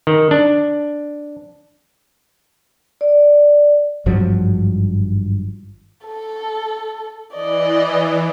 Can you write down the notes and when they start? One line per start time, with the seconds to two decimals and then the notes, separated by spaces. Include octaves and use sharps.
0.07 D#3
0.31 D4
3.01 D5
4.06 G#1 G2 F3 F#3
6.06 A4
7.34 E3 D5 D#5